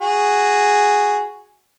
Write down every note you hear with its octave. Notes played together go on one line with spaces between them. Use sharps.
F#4 G#4